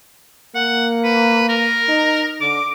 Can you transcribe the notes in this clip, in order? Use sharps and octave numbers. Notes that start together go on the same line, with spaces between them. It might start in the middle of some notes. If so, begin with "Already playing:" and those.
A#3 F#5
B4
A#4
D#4
D3 D6